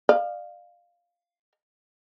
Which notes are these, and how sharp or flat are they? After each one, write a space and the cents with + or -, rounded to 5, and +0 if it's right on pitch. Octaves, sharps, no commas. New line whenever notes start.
D5 +45 F5 +0